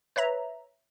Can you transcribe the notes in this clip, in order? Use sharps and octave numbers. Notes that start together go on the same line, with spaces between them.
B4 C#5 E5 A#5